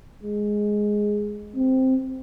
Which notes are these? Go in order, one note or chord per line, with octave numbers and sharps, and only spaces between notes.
G#3
C4